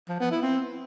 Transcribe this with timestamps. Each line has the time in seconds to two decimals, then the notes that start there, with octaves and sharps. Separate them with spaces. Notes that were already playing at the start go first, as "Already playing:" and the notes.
0.09 F3
0.20 B3
0.31 E4
0.43 C4